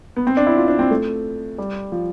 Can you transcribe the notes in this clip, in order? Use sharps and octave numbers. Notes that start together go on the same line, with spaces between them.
B3
C4
D4
E4
F4
D4
C4
A3
G3
F3